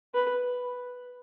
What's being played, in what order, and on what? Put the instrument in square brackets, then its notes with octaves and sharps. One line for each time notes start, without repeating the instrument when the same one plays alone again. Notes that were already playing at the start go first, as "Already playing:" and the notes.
[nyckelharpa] B4